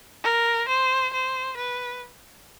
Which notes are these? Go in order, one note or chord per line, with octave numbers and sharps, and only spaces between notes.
A#4
C5
C5
B4